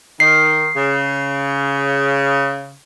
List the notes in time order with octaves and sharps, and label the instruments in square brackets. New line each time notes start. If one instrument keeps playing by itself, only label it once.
[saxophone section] D#3 [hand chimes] C7
[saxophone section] C#3